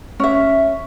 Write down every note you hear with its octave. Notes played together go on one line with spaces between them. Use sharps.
C#4 E5